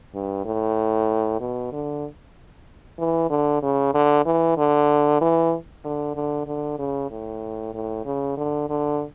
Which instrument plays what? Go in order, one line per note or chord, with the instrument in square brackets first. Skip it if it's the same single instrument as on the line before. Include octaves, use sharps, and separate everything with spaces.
[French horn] G2
A2
B2
D3
E3
D3
C#3
D3
E3
D3
E3
D3
D3
D3
C#3
A2
A2
C#3
D3
D3